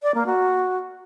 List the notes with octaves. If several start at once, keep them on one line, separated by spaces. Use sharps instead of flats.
D5
A#3
F#4